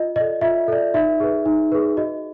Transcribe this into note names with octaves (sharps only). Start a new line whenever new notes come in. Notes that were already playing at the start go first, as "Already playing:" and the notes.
Already playing: F4 D#5
A4 D5 D#5
F4 E5
A4 D5
D#4 E5
G#4 B4
D#4
G#4 B4
F#4 D#5